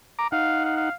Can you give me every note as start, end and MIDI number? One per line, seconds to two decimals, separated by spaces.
0.19 0.27 82
0.19 0.27 86
0.32 0.89 63
0.32 0.61 77
0.32 0.89 78
0.65 0.74 77
0.77 0.93 77